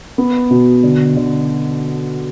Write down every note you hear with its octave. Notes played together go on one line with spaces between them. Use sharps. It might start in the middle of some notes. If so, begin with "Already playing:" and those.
B3
B2
D3
D3